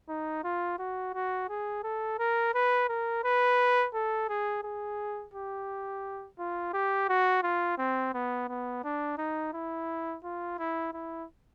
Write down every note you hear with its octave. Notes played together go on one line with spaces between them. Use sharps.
D#4
F4
F#4
F#4
G#4
A4
A#4
B4
A#4
B4
A4
G#4
G#4
G4
F4
G4
F#4
F4
C4
B3
B3
D4
D#4
E4
F4
E4
E4